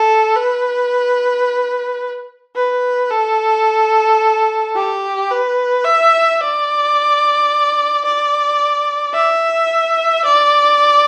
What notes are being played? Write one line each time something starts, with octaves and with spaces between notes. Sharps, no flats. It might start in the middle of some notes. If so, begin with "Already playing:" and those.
Already playing: A4
B4
B4
A4
G4
B4
E5
D5
D5
E5
D5